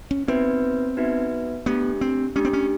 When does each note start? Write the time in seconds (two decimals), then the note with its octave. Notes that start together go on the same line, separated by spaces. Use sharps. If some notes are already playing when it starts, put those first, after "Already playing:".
0.11 C#4
0.28 B3 C4 D#4 F#4 B4 E5
0.97 B3 D#4 F#4 B4 E5
1.66 A3 B3 D4 G4
2.01 C4
2.36 A3 C#4 D4 G4
2.45 C4
2.53 C#4